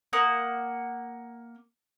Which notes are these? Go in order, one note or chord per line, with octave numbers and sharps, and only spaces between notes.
A#3 F#5 D#6